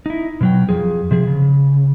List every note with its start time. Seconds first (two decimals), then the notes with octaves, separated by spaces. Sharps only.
0.06 D#4 E4
0.41 B2 F#3 G5
0.69 F2 F3 G#4
1.11 C3 F3 G#4
1.27 C#3